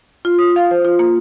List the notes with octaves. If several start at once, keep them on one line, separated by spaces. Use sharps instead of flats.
F4
D#6
F5
C5
F4
A#3